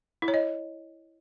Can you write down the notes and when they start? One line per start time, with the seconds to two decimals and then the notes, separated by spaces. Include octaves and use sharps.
0.22 E4
0.28 C#5
0.34 D#5